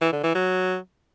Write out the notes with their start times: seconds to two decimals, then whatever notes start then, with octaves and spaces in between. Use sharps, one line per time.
0.01 E3
0.12 D3
0.24 E3
0.35 F#3